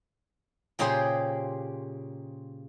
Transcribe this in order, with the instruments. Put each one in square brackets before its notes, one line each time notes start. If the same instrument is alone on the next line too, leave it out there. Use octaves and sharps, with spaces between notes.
[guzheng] A#2 C#3 G4 G#4 C5